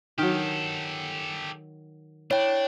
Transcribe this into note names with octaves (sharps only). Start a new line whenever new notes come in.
D#3 F#3 G4 A4
D4 E4 C#5 G5